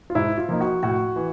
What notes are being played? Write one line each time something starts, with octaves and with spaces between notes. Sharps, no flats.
F4
G#2 E4
F4
F3 A#3 D#4
F#4
A2 F#4
E3